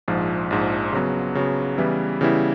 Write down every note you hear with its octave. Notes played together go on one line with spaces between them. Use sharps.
A#1 G#2 F3
A#1 G#2 F3
C#3 F#3 B3
C#3 F#3 B3
C#3 E3 G3 B3 E4
C#3 E3 G3 B3 E4